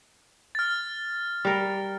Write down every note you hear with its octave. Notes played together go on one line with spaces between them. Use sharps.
F6 A6
G3 A#4